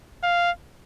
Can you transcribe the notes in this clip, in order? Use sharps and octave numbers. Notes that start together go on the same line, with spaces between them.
F5